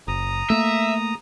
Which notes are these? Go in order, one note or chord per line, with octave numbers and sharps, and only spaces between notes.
F#1 A#5 D#6
A3 A#3 E5